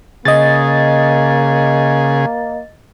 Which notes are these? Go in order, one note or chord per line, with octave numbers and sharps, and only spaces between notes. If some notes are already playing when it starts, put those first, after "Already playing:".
C#3 A#3 G#4 D#5 A6